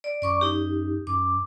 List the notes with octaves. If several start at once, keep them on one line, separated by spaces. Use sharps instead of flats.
D5
F#2 D5 C#6 D6
D#4 G4
F#2 D6